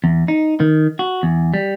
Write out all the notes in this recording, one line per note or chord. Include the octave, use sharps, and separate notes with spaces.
E2
D#4
D#3
F#4
E2
G3